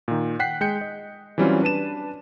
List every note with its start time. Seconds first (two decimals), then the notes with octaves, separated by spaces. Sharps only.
0.08 A#2 D#3
0.39 F#5 G5 F#6 B6 C7
0.61 G#3 G5 G6 C#7
0.81 D#5
1.38 E3 F#3 G3 C4 C#4 F4
1.62 D4 B4 A5 D#7 E7